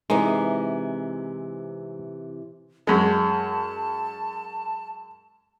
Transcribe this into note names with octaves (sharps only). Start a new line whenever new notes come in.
C3 E3 G#3 D#4
F#2 G#3 A5